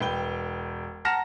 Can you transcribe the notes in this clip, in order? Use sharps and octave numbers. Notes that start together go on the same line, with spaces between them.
E1 B4 G5 G7
F#5 A5 A#5 F6 A#6 E7